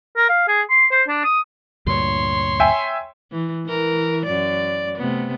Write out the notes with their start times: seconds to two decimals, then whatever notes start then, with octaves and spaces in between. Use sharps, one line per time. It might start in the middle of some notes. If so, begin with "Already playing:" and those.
0.16 A#4
0.29 F5
0.48 G#4
0.70 C6
0.91 C5
1.08 D4
1.24 D#6
1.87 D2 G2 A#2 C#5 C6
2.60 E5 G5 G#5
3.32 E3
3.66 E3 A#4
4.26 F#2 D5
4.98 C3 A3 B3